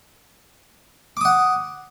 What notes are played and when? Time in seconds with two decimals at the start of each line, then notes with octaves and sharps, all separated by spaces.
1.17 D6
1.21 D#6
1.25 F#5